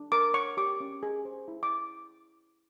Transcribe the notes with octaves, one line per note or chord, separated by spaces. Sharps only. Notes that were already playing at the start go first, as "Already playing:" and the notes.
Already playing: D4
A#4 D6
C#5 C#6
G4 D6
C#4
G#4
C5
E4
D6